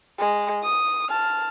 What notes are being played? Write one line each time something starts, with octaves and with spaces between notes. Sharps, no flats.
G#3
D#6
A5 F6